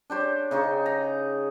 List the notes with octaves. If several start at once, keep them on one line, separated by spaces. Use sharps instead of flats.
D4 G4 C5 C#5
C#3 D#4 G#4 C#6
A#5